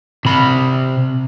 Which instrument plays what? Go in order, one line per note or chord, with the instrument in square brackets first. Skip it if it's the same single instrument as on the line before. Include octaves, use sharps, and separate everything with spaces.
[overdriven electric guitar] C3 B5